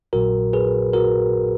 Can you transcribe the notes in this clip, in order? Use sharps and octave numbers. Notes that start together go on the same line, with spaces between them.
A#1 A#2 F#3 F#4 A#4
G#4 B4
F#4 A#4